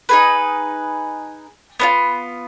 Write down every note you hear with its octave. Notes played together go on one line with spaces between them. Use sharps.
D#4 G#4 B4
B3 D4 F4